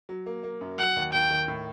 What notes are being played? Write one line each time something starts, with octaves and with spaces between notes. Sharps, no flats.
F#3
A#3
A#3
F#2
F#3 F#5
D#2
D#2 G5
D#3
A2